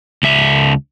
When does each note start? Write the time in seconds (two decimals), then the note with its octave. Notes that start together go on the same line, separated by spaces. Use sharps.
0.23 C#2 E5